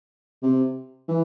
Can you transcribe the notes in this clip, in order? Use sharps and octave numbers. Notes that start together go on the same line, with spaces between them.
C3
E3